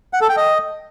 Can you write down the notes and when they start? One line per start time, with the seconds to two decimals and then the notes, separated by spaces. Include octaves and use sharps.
0.13 F#5
0.21 A4
0.29 G5
0.37 D#5